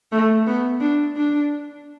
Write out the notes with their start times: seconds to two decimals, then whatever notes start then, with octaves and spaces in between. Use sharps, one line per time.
0.12 A3
0.47 B3
0.81 D4
1.17 D4